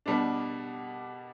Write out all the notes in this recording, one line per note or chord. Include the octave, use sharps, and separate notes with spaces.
B2 G3 D4